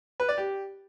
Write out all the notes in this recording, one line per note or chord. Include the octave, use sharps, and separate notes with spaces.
B4
D5
G4